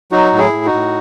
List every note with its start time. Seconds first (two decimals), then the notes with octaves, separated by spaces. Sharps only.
0.12 F#3 D#4 F#4
0.32 A2
0.38 E4 G#4
0.53 A2
0.66 D#4 F#4
0.73 A2